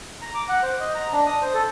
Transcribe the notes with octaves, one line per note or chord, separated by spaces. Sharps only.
A#5
D6
F#5
C5
D#5
A#5
D4
D#6
C5
A4